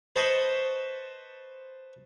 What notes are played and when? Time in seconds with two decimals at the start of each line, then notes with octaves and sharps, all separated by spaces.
0.16 B4 C5 D#5 A5 B5 C#6